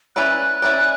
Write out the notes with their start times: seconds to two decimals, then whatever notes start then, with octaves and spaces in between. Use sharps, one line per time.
0.16 C#4 E4 B4 D5 F#6
0.62 C#4 E4 B4 D5